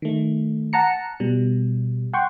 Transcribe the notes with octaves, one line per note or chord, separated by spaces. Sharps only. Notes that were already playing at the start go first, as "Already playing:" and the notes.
D#3 A3
F#5 A5 A#5 C#7
B2 G3
F#5 G5 C6 C#6